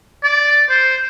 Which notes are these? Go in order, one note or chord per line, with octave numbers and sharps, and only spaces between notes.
D5
C5